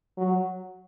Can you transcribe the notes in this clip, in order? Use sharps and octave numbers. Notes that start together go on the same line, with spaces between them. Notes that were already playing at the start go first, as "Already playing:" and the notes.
F#3